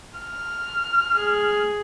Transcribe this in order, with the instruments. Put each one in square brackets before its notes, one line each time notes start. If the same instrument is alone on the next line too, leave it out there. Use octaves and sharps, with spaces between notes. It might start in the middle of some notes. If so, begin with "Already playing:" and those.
[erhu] F6
[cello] G#4